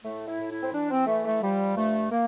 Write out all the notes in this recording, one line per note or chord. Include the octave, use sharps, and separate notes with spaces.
A2 A3
E4
A2
E4
C4
E3 D4
C4
E3 A3
A3
F3 G3
G2 A3
A#3